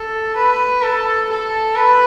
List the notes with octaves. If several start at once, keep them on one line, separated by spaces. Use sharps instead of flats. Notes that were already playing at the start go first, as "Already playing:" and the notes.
Already playing: A4
B4
A4
A4
B4